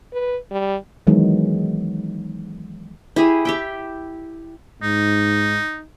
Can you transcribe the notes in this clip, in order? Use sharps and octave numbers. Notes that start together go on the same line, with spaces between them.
B4
G3
D#3 E3 F#3 G#3 B3 D#4
E4 G4 G#4
G4 E5 G5
G#2 D#4